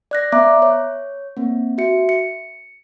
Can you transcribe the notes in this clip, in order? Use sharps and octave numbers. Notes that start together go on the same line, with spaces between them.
D5 F#6 A#6
B3 E5 A#5 D6 F#6
C#5
A#3 C4
F#4 E5 C#7
C#7